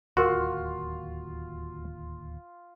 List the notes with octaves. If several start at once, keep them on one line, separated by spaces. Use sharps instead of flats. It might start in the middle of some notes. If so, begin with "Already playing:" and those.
D1 D#2 F4 F#4 A#4 C6